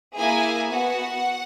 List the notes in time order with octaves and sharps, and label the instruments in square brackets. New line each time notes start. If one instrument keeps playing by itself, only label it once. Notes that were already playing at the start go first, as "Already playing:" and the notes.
[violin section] A#3 E4 G#4 G#5
B3 F#4 F#5